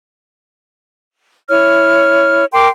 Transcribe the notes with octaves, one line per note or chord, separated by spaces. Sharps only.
E4 C#5 F6
A#4 G5 C6 D6